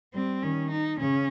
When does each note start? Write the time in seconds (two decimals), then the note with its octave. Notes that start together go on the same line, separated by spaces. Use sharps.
0.14 G3 C4
0.43 D#3 C#4
0.71 D#4
0.99 C#3 C#4